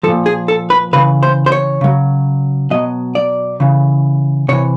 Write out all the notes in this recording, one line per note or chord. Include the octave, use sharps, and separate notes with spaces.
A#2 F3 A4
G#4
A4
B4
C#3 E3 B4
C5
C5
C#5
C#3 F#3
B2 F#3 D#5
D5
C#3 E3
C3 E3 C#5